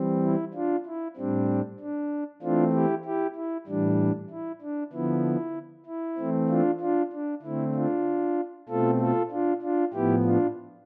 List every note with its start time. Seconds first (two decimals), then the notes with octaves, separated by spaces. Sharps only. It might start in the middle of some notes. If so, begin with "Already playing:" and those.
Already playing: E3 G3 C4
0.23 E4
0.54 D4 F4
0.86 E4
1.17 A2 G3 C4 D4
1.80 D4
2.42 E3 A3 C4 D4 F4
2.73 E4 G4
3.05 E4 G4
3.36 E4
3.67 A2 E3 G3 D4
4.30 E4
4.61 D4
4.93 D3 F3 B3 E4
5.86 E4
6.18 E3 A3 C4
6.49 D4 F4
6.80 D4 F4
7.12 D4
7.43 D3 A3 C4 E4
7.75 D4 F4
8.69 B2 A3 C4 F4 A4
9.00 F4 A4
9.30 D4 F4
9.62 D4 F4
9.93 A2 F3 B3 E4 G4
10.24 D4 F4